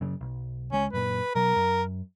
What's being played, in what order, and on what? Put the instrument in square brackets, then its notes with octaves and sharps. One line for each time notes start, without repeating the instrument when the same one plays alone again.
[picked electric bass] F#2 C#3
B1
[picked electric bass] C#2 G#3 [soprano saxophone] C#4
[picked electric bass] F#2 A#2 [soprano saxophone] B4
[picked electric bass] B2 F#3 [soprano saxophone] A#4
[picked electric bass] F#2